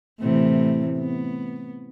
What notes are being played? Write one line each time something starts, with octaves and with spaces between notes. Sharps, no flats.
A2 C3 E3
B3